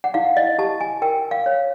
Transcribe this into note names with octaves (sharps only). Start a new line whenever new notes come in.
F#5
E4 F5
D#5
G4 A5
G#5
A#4 G5
F5
C#5